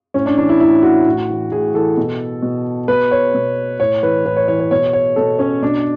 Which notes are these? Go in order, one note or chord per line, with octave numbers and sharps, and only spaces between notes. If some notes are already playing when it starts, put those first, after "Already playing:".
A2 C#4
D4
E3 D4
E4
A2 E4
E3 F#4
A2
E3
A2 G#4
E3 A4
B2
B2
B2 B4
C#5
B2
A2 C#5
E3 B4
A2 B4
C#5
E3 C#5
C#5
B2 C#5
C#5
B2 A4
C#4
B2 D4